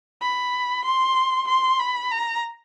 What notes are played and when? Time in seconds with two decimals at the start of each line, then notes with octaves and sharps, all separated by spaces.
0.21 B5
0.84 C6
1.47 C6
1.79 B5
2.11 A#5